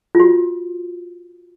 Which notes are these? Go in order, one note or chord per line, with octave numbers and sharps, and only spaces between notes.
F4
F#4